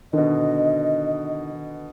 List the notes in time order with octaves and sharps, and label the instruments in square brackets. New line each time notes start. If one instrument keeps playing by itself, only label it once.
[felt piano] B2 D3 [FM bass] D#3 [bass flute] D#5